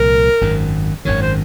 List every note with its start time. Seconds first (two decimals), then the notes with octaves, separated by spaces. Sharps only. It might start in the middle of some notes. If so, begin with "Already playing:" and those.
Already playing: C2 A#2 F3 A#4
0.41 G#1 F#2 D#3
1.05 G#1 F#2 D#3 C#5
1.22 C5